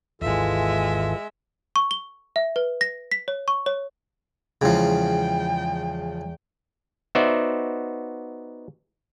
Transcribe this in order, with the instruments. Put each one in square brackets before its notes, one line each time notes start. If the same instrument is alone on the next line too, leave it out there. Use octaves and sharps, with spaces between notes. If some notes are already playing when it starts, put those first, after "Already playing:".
[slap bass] G#1 D#2 [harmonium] E3 F4 A4 [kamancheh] G#3 E5
[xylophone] C#6
G7
E5
B4
A#6
B6
C#5
C#6
C#5
[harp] E2 G#3 A#6 [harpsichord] C#3 F3 [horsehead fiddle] G5
[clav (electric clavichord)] B3 D#4 F#4 C5 D5 E5